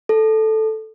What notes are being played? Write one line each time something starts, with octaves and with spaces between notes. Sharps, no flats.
A4